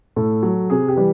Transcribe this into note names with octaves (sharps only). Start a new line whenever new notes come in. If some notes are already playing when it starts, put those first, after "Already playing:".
A2 A4
F#3
C3 G#4
G4
E3 G3